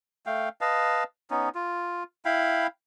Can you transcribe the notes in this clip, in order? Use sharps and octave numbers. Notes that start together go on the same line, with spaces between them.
A3 F5 G5
B4 D#5 F5 A5
B3 C#4 D#4
F4
E4 F5 G5 B5